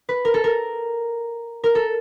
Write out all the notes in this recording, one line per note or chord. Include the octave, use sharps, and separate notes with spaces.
B4
A#4
A4
A#4
A#4
A4